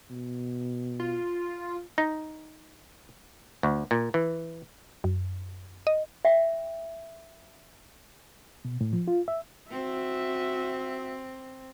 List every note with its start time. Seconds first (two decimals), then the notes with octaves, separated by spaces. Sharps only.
0.10 B2
1.00 F4
1.98 D#4
3.63 D2
3.91 A#2
4.14 E3
5.04 F#2
5.87 D#5
6.25 E5 G5
8.65 B2
8.81 A2
8.93 F3
9.08 F4
9.28 E5
9.71 C4 F#4 E5